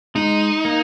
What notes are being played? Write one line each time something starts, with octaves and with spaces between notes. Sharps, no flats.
G#3 D#4
A#3